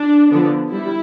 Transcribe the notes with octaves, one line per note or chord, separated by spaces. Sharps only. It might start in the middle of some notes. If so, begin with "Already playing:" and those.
Already playing: D4
D3 F3 B3 D4
G3 E4